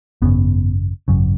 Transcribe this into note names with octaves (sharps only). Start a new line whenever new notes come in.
G#1 F#2 C#3 B3
G#1 F#2 C#3